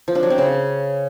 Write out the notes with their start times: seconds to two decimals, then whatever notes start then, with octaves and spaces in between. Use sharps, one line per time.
0.08 F3
0.15 D4
0.23 F#3
0.30 C4
0.38 C#3